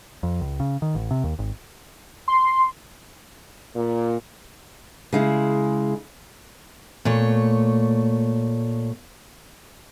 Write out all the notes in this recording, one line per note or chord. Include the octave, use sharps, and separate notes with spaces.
F2
C#2
C#3
D#3
A1
C3
D#2
G#1
C6
A#2
C#3 G#3 E4
A#2 A3 C#5